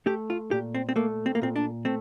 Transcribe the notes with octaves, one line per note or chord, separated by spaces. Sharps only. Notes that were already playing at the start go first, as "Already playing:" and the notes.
A3 G4
F4
A#2 G4
C4
C4
A3 A#3
C4
A#3
A#2 C4
D4
A3 C4